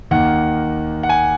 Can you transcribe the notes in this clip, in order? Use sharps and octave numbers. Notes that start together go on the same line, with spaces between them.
D#2 D#3 A#3 F#5
F#5
G#5